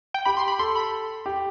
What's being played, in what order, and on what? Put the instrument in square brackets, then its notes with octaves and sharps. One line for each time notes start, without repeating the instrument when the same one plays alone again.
[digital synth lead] G5
[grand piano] G4 [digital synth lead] B5
[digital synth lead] C6
B5
[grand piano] A4 [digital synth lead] C6
[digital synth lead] B5
[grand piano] G4